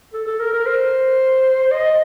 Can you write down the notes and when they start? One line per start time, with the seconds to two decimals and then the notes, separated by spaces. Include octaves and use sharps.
0.14 A4
0.27 A4
0.40 A#4
0.53 A#4
0.66 C5
1.72 D#5